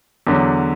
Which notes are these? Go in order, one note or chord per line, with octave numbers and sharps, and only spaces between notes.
E2 D3 F#3